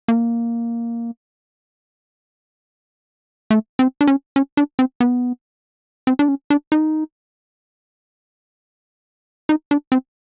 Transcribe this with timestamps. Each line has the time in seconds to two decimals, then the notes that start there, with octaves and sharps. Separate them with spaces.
0.08 A#3
3.51 A3
3.79 C4
4.01 D4
4.07 C#4
4.36 C#4
4.57 D4
4.79 C4
5.01 B3
6.07 C4
6.19 D4
6.28 C#4
6.50 D4
6.72 D#4
9.49 D#4
9.71 D4
9.92 C4